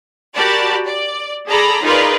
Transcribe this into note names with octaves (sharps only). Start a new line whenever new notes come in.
F#4 G4 A#4 D5 A5 B5
D5
G#4 A4 D5 A#5 B5
D#4 F4 G#4 A#4 B4 D5